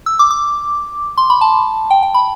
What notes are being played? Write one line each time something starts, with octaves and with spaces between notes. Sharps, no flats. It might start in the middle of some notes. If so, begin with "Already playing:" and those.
E6
D6
D6
C6
B5
A5
G5
G5
B5